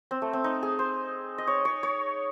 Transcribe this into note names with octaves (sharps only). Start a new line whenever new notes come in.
C4
A3
C4
D#4
G#4
C5
D#5
C#5
C#5
C#5